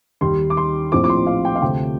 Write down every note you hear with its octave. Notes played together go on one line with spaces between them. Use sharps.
D#2 D#3 G3 C6
D6
C6
A#1 A2 F3 C4 D6
D6
C6
F5
G5
F5
D2 C3 F3 A3 G5